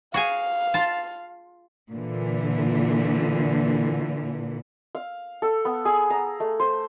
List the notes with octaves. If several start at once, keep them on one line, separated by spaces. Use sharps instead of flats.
F#4 G#4 F5 G#5
F4 A5
A#2 D3 E3
F5
A4
B3
G#4
A#5
A3
C5